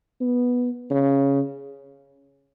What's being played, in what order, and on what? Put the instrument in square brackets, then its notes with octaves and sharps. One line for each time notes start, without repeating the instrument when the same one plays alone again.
[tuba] B3
C#3